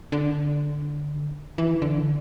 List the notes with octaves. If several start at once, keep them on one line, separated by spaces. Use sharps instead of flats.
D3
E3
D3